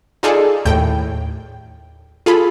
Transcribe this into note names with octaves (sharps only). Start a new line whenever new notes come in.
D#4 F4 G#4 A4 D5
D#2 A2 G5
F4 G#4 A4 B5